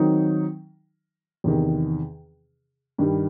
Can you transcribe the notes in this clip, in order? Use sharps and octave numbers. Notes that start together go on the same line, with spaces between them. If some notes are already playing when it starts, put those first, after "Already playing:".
Already playing: D#3 F#3 C4 D#4
E2 C3 D#3
G2 D#3 G3